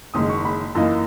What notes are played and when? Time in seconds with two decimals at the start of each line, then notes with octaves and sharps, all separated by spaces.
0.14 F#1 F#2 D#3 G#3 D#6
0.29 C#6
0.45 B5
0.75 F#2 E3 A#3 D#4